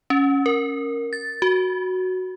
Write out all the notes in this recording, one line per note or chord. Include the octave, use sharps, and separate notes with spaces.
C#4
A#4
A6
F#4